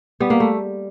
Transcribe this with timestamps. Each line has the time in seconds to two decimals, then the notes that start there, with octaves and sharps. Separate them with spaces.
0.20 G3 B3
0.30 A#3
0.40 A3